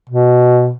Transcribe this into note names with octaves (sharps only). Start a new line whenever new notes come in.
B2